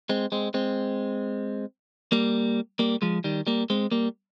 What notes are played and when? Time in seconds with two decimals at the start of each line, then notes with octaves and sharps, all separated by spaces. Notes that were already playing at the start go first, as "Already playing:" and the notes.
0.09 G#3 C4
0.32 G#3 C4
0.54 G#3 C4
2.12 G3 A#3
2.79 G3 A#3
3.02 F3 G#3
3.24 D#3 G3
3.47 G3 A#3
3.70 G#3 C4
3.91 G3 A#3